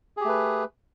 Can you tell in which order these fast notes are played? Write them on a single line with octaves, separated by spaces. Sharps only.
G#4 G4 A3 B4